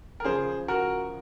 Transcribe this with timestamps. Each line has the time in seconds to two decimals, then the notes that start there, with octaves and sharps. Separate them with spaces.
0.20 A#4
0.24 C#3 F3 G#4 C5
0.68 F#4 A#4